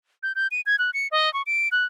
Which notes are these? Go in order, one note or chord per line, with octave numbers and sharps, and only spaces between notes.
G6
G6
D#7
G#6
F#6
C#7
D#5
C#6
D7
F#6